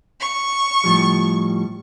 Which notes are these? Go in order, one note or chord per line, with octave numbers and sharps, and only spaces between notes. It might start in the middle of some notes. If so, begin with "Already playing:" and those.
C#6
A2 F3 G3